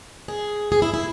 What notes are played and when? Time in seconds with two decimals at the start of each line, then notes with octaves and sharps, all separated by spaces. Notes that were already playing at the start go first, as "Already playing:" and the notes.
0.28 G#4
0.72 G#4
0.82 E4
0.94 E4